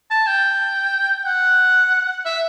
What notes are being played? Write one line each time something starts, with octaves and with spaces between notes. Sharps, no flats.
A5
G5
F#5
E5